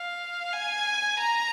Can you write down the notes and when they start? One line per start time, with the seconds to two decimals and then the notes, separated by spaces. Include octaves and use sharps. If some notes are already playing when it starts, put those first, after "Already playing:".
Already playing: F5
0.53 G#5
1.20 A#5